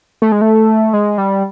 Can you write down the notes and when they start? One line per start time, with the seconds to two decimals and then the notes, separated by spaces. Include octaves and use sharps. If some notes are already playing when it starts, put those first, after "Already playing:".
0.22 A3
0.32 G#3
0.41 A3
0.93 G#3
1.18 G3